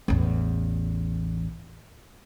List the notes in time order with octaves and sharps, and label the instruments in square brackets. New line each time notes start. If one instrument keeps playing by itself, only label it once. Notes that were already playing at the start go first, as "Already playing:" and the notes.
[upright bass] A1 E2